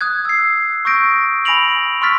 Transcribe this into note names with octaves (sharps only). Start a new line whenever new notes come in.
D#6 F#6 G#6
E6 C7
C#6 D#6 E6 G6 A#6 D7
G#5 B5 A#6 D7 F7 F#7
C6 C#6 E6 F6 A6 B6